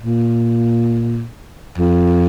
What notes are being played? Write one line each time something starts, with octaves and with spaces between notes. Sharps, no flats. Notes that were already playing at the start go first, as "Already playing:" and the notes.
A#2
F2